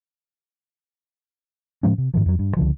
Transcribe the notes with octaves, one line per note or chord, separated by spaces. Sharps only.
A2 F3 G#3 C#4
C3
G#2 D#3 F3
F2 F#3
G2
C#2 D3 F3